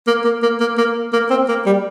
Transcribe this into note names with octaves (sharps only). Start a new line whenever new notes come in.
A#3
A#3
A#3
A#3
A#3
A#3
C4
A#3
G3